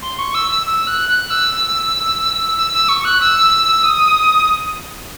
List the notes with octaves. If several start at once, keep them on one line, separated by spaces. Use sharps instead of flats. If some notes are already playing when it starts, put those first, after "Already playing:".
C6
C#6
E6
E6
E6
F#6
F#6
E6
E6
E6
C#6
F#6
E6
D#6